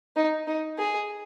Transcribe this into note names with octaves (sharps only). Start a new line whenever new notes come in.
D#4
D#4
G#4